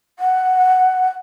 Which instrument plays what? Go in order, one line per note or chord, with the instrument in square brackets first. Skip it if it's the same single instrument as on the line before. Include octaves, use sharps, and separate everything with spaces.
[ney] F#5